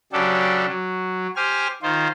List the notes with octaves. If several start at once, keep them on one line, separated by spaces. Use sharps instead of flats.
C#3 F#3 D4 G4 A4
F#3
G4 C5 G#5 F6
D#3 F4 C5